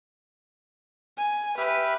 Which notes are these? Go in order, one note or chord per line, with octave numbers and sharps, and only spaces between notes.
G#5
G4 B4 E5 F6